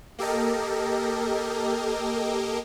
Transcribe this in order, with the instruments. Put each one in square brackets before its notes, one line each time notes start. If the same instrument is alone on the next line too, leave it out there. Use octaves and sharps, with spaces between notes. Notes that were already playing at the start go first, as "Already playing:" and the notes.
[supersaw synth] A#3 G4 A4 A#4 D#5